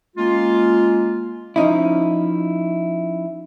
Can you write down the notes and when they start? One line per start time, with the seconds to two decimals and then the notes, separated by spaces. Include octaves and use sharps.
0.17 G#3 A#3 C#4 F4
1.56 F3 C#4 D#4 E4